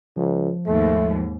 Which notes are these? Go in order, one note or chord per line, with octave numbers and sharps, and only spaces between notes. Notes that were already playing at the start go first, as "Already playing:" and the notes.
C#2 F3
D#2 G#2 A3